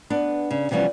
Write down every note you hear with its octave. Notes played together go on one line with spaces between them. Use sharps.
B3 D4
C#3
C3 E3 F3 G3 B3 C#4